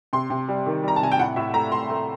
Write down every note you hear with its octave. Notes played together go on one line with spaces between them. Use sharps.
C3 C6
C3
G3
D#3
G3 A#5
A5
C3 G#5
G5
A2 F#5
A2 E5
A3 A#5
A2 C6
A3